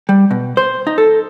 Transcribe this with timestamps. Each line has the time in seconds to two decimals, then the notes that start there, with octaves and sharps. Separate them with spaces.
0.09 G3
0.31 B2
0.57 C5
0.87 D#4
0.98 A4